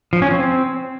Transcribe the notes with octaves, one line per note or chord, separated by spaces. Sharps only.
F3
C#4
C4